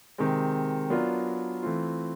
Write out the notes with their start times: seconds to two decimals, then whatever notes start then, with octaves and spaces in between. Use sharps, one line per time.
0.18 C3 D#3 G#3 C4
0.90 F#3 B3 D4 F4 A#4
1.63 E3 A3 C4 F4